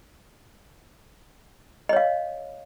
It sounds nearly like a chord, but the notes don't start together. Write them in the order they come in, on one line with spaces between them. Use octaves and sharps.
D#5 C#5 F5